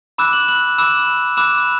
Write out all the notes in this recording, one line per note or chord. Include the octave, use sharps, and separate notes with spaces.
B5 D6 E6 F#6 E7
F#6 F#7
F#6 F#7
B5 D6 E6 F#6 E7
B5 D6 E6 F#6 E7